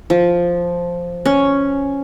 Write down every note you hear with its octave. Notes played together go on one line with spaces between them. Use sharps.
F3
C#4